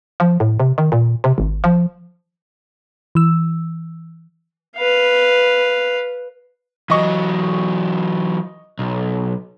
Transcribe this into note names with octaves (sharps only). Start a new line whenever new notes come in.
F3
A2
C3
D#3
A#2
C3
G#1
F3
E3 E6
B4 F5
E3 F#3 D#5 C#6
B1